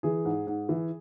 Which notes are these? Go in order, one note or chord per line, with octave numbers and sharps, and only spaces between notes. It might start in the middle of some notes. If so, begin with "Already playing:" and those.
E3 G#4
G#2
G#2
E3